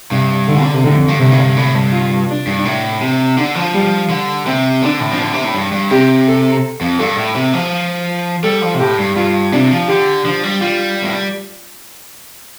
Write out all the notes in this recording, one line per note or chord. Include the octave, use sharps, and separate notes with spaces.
G2 C3
D3
D3
C3
A2 D3
F2
G2
G2 C3
A2
G2
A2
G2
F4
D4
G2
A2
C3
D3 D4
F3
G3
D3
C3 C4
D3 D4
A2
F3
D3
C3
A2
G2
G2
C3 G4
A4
F2
G2 A4
A2
C3
F3
G3 A4
F3
C3
A2 G4
G2
G2 F4
C3 D4
F3
D3 G4
F3 D4
G3
G3 F4
A2